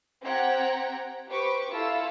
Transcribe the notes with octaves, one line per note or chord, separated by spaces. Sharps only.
C4 G4 F#5 G5 A#5 G#6
G4 B4 C5 C#6 D6
E4 F4 A4 E6